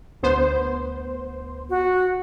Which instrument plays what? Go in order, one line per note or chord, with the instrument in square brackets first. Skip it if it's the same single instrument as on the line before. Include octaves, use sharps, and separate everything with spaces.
[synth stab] D2 B3 C5
[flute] F#4